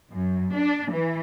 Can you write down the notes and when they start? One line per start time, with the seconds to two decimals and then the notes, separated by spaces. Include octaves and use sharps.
0.12 F#2
0.55 D4
0.92 E3